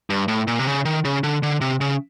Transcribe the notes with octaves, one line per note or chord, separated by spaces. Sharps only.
G2
A2
A#2
C3
C#3
D#3
C#3
D3
D3
C3
C#3